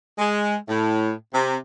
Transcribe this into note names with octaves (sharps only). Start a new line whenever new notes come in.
G#3
A2
C3